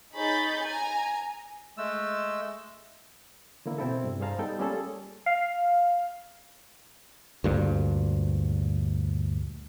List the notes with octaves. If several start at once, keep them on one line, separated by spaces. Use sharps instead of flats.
D#4 G#4 C#5 B5 G6 A6
G#5 A#5
G#3 A3 E6
D3 E3 A#3 E4
B2 C4 E4 A4
G2 C3
G2 G#4 C5 F5 A5 A#5
G3 B3 D#4 A4 G5
G3 A#3 C#4 F4 G#4 A4
F5
D2 G2 A#2